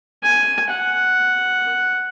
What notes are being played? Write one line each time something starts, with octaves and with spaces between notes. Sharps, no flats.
G#5
F#5